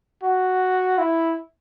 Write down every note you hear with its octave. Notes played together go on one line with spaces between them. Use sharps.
F#4
E4